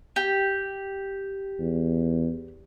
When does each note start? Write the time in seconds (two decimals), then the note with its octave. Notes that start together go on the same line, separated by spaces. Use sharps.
0.16 G4
1.60 E2